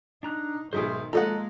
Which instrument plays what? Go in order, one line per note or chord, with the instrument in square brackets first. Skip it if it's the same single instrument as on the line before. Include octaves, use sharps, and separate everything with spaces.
[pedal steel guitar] D4 A#5 F#6 [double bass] D#4
[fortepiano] B1 G#2 G#3 [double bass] D#3 [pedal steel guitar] C5 E5 D#6
[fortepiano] F3 [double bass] G#3 A#3 [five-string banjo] A4 D#5 F#5 [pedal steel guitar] A#5